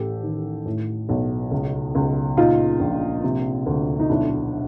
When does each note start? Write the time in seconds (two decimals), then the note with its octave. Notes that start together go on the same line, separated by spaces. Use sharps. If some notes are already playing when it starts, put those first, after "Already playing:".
Already playing: A1 G4 A4
0.23 D#3
0.65 A2
1.09 B1
1.51 C#2
1.95 C#2
2.37 A#2 D#4 F4
2.80 A#1
3.24 C3
3.66 D2
4.00 D#4
4.09 B1 D4 E4